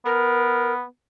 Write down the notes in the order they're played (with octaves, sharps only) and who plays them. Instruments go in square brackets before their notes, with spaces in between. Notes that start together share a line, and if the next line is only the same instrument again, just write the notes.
[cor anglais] B3 [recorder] A#4